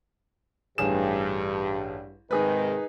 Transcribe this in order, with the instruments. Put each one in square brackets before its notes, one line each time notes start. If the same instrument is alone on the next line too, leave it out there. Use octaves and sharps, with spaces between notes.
[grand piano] A1 G#4 E7 [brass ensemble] G2
[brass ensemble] G#2 C3 D#3 [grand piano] D#4 G#4 B4